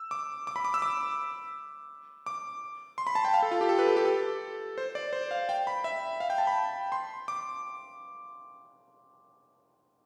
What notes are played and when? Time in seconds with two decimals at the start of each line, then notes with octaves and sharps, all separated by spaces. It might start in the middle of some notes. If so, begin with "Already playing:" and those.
Already playing: E6
0.11 D6
0.47 D6
0.56 B5
0.65 D6
0.74 E6
0.82 D6
2.26 D6
2.98 C6
3.07 B5
3.15 A5
3.25 G5
3.34 F5
3.42 A4
3.51 F4
3.61 G4
3.69 A4
3.79 B4
3.87 A4
3.96 G4
4.05 A4
4.78 C5
4.95 D5
5.13 C5
5.31 F5
5.49 G5
5.67 B5
5.84 E5
6.20 F5
6.30 G5
6.38 A5
6.47 B5
6.92 C6
7.28 D6